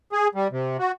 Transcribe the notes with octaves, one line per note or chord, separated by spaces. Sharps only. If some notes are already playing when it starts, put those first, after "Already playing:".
G#4
G3
C3
F#4